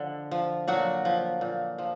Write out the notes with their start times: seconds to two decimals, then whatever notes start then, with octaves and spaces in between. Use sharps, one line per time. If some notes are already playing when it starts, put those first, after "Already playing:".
Already playing: D3 F3
0.31 F3
0.68 A#2 F#3 F#4
1.05 F3
1.41 A#2
1.78 F3